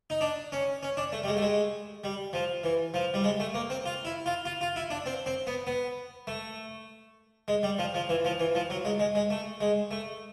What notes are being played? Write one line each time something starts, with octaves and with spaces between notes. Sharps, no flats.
D#4
D4
C#4
C#4
D4
A3
G3
G#3
A3
G#3
G3
F3
E3
F3
G3
G#3
A3
A#3
C4
F4
E4
F4
F4
F4
E4
D4
C4
C4
B3
B3
A3
G#3
G3
F3
F3
E3
F3
E3
F3
F#3
G#3
G#3
G#3
A3
G#3
A3